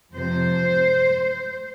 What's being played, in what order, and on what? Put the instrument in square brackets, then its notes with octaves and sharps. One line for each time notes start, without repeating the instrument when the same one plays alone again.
[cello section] F2 C3 F3 C5